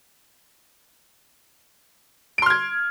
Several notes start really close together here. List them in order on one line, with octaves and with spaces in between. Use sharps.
D7 C6 F6 G#6